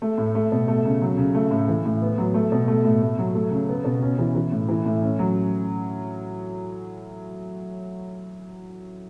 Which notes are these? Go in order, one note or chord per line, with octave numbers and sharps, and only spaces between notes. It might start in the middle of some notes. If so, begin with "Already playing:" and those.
A3
A2
A3
B2
A3
C#3
F#3
C#3
A3
A2
E3
A2
B3
F#3
A3
B2
A3
A2
A3
F#3
A3
C#3
B3
B2
C#4
E3
E3
A2
E3
A2
C#4
F#3